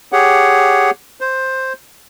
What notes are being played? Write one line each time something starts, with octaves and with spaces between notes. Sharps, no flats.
G4 G#4 C#5 F#5
C5